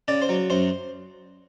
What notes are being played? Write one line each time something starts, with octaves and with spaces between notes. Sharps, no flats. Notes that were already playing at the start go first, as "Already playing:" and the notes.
C#3 D5
C5
F#3
F#2 C5